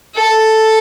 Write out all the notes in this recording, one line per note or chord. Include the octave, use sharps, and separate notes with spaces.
A4